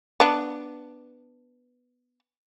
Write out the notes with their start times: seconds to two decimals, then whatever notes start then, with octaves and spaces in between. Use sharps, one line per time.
0.20 B3 D4